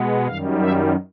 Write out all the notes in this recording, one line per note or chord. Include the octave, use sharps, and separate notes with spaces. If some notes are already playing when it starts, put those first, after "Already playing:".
Already playing: B2 G#3 B3
F#2 D#3 G3 F5
E5